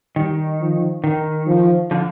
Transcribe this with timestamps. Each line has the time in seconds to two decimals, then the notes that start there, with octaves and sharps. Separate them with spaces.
0.16 D#3 G3
0.61 F3
1.04 D#3
1.47 F3
1.91 D3 F3